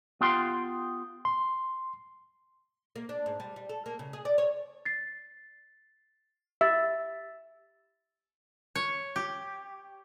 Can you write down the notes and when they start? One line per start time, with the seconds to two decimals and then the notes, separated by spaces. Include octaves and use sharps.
0.21 B3 F4 G4 G5 C6
1.25 C6
2.96 A#3
3.09 D4
3.26 G#2
3.40 G3
3.56 G3
3.69 A4
3.86 A#3
3.99 C#3
4.13 G#4
4.25 D5
4.38 C#5
4.85 A6 C7
6.61 G4 E5 E6 A6
8.75 C#5
9.16 G4